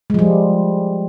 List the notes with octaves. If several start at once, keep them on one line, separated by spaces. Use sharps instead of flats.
F3 G3 G#3